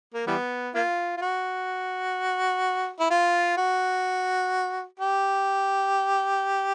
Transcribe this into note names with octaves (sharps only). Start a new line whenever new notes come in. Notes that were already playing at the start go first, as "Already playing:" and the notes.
A#3
E3 G3 B3
A#3 F4
F4
F#4
E4
F4
F#4
G4